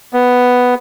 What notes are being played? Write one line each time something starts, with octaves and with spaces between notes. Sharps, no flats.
B3